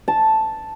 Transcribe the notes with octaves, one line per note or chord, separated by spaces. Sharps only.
A5